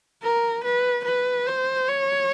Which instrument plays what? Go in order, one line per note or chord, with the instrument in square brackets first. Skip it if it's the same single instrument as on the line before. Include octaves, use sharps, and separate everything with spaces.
[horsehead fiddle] A#4
B4
B4
C5
C#5